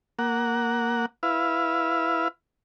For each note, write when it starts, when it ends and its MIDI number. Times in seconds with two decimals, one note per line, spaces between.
0.19 1.06 58
0.19 1.06 78
1.23 2.28 64
1.23 2.28 71
1.23 2.28 77